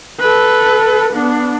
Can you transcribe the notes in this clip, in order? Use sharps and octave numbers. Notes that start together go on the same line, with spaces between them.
A4 B4
B3 D4